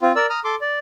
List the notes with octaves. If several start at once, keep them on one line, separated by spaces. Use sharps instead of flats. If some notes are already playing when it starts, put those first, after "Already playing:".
C4 F4
A#4 D5 E6
A#5 D#6 F6
A4 C6 D6
D5